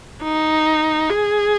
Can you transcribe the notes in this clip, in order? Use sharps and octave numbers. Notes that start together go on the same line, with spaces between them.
D#4
G#4